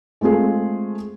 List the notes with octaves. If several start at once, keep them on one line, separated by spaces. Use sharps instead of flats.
G#3 A3 C4 F4 G#4